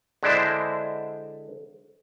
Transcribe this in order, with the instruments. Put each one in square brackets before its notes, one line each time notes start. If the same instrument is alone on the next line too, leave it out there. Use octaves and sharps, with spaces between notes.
[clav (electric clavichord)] D3 G#3 D4 E4 C5